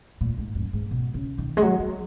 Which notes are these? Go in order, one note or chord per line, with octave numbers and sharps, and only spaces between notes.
A#2
G#2
F#2
G#2
B2
C#3
D#3
G#3
F#3
F#3